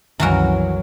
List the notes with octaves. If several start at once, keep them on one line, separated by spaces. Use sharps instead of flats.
C2 F#2 D#3 E3 F#3 F#4 A#4